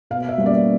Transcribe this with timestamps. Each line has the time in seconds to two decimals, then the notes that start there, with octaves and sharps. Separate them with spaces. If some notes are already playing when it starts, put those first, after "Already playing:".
0.10 B2 F5
0.29 E5
0.38 G3 A#3 C#4
0.46 D5